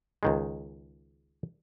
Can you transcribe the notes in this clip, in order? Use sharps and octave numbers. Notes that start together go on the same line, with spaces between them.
C#2 D#3 G#3